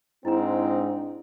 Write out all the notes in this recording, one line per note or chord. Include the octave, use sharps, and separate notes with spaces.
G#2 C4 D4 E4 A#5